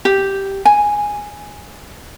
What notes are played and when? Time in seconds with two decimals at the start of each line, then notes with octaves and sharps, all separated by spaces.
0.05 G4
0.65 G#5